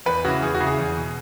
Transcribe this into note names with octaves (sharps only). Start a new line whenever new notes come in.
E2 B4
C#3 E3 F#4
E2 G#4
F#4
C#3 E3
G#4
E2
B2